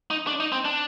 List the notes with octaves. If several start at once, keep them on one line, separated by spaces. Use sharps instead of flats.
D#4
D4
D#4
C4
D4